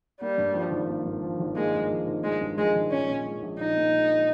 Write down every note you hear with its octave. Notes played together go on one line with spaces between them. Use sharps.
G3 A#3
G2
F3
G#1
A#3
G2
F3
G#1
G#3 A#3
G2
F3
G#1
G#3 A#3
G2
F3 G#3
G#1
A#1 C#4
A#2
G#3
A#1
A#1 D#4
A#2
G#3